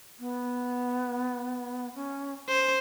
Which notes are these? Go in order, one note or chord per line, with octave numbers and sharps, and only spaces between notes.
B3
C#4
C#4 C5